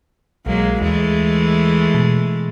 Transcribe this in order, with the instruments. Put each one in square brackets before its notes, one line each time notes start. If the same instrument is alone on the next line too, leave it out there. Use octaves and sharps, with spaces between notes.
[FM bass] B1 [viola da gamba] F#3 G#3 A#3
[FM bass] D#2 [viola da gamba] E3 G#3 A3
[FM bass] B2